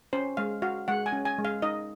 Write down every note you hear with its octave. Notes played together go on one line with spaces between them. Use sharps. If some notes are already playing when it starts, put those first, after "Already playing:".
C#4 C5
G#3 F5
F#4 F5
G#3 F#5
G#5
C#4
G#5
G#3
F5
D#4 D#5